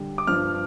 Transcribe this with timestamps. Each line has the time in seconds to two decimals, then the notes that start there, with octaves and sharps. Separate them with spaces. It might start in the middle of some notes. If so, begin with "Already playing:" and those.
Already playing: D3 G3
0.18 D6
0.27 G2 F3 F6